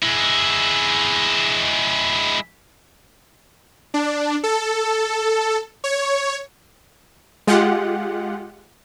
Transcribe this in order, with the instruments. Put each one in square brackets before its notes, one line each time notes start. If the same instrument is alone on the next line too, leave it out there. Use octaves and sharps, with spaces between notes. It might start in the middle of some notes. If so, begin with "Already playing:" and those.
[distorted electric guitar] G#3 E4
[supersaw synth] D4
A4
C#5
G#3 F4 G4 F#5